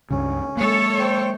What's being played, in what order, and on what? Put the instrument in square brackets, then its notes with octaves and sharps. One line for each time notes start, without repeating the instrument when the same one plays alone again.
[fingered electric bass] C#2 G2 C#3 [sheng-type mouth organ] C#4
[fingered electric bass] G#3 A#3 [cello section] A4 C#5
[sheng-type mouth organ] C5 G5